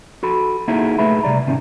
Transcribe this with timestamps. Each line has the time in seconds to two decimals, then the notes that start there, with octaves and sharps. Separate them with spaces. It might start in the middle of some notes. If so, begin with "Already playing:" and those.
0.23 F#4 A4 B5
0.68 A#3 D#4 E4 F#4 G#4 A4
0.98 B1 A3 G#4 B4 E5 B5
1.23 C3 G3 D5 A#5
1.47 G#2 C3 D#3 C4 C#4